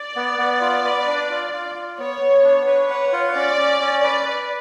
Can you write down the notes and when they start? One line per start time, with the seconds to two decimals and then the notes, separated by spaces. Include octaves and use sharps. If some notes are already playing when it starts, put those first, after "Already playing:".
Already playing: D5
0.16 B3
0.38 B3
0.61 F4
0.85 B4
1.07 D4
1.30 F4
1.53 F4
1.75 F4
1.99 B3 C#5
2.21 B3
2.44 D4
2.67 B4 C#5
2.90 F#5
3.13 F4
3.35 C#4 D5
3.58 C#4
3.81 C#4
4.04 B4 D5
4.26 B4